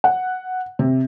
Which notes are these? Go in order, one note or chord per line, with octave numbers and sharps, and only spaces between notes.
F#5
C3